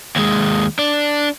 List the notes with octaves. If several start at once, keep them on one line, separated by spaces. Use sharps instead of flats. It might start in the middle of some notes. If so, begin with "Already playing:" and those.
D#2 G#3
D4